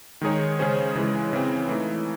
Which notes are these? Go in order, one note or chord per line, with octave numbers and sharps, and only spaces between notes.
D#3 G#3 D#4 G#4 C#5
C#3 G#3 C#4 G#4 C5
C#3 E3 G#3
C#3 E3 C4
E3 A3 D#4